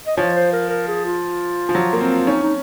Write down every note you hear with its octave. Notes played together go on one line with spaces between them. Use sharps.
D#5
F3 C#5
C5
A#4
A#4
G#4
F4
F3
F#3
A#3
C4
C#4 D#4
D#4